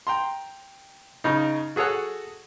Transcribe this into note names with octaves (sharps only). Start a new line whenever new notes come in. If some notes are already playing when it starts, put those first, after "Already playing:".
G5 A#5 C6
C#3 D#4
F#4 G#4 A4 C#5 F#5